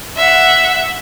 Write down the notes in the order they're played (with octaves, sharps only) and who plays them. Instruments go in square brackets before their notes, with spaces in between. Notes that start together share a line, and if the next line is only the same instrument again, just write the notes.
[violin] E5 F#5